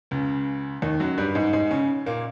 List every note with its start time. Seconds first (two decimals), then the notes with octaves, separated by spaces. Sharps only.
0.11 C#2 C#3
0.82 D#2 D#3
1.00 F#2 F#3
1.18 G2 G3
1.35 G#2 G#3
1.53 G#2 G#3
1.71 C#3 C#4
2.06 A#2 A#3